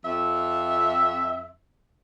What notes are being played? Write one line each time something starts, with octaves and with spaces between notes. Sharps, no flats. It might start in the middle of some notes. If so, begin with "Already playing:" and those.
F2 E5